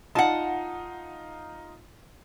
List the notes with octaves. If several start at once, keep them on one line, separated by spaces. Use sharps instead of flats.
D#4 F4 F#5 A5